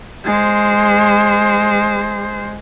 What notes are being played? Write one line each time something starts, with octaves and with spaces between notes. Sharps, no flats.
G#3 C5